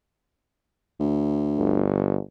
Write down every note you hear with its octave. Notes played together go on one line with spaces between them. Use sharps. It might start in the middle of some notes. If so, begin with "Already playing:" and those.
D2
G1